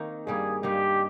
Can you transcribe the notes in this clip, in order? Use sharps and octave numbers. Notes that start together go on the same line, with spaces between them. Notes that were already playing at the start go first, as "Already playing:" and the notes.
Already playing: D#3 A#3 C4 D#4
G2 G3 A#3 G#4
G2 G3 A#3 D#4 G4